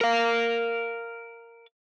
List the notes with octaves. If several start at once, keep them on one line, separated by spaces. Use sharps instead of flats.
A#4 F5